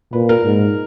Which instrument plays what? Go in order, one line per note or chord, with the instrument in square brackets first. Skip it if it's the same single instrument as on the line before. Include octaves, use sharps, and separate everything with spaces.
[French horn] A#2 [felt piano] B4
[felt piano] A#4
[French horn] G#2